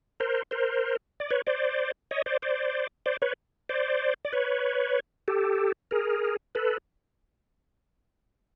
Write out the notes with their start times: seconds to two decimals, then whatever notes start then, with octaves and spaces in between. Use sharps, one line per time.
0.20 A#4 C5
0.51 A#4 C5
1.20 D5
1.31 B4 C#5
1.47 C5 D5
2.11 C#5 D#5
2.26 C5 D5
2.42 C5 D5
3.06 C5 D5
3.22 B4 C#5
3.69 C5 D5
4.25 D5
4.33 B4 C#5
5.28 G4 A4
5.91 G#4 A#4
6.55 A4 B4